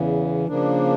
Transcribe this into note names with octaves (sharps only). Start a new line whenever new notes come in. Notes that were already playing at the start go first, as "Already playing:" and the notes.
Already playing: E2 C#3 E3
C#3 F3 A#3 D4